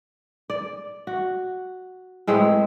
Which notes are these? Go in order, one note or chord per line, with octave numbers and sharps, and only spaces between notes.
D5
F#4
A2 G#3 C4 B4